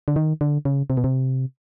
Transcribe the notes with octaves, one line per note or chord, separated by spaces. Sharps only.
D3
D#3
D3
C#3
C3
B2
C3